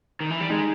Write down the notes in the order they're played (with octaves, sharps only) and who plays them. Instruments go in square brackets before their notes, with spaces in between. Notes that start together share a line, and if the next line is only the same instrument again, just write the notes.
[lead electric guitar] D#3
E3
G3
[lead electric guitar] G#3 [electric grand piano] D#4